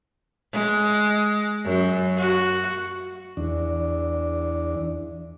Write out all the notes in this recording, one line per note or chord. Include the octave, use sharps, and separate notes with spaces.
G#3
F#2
F#4
E2 D4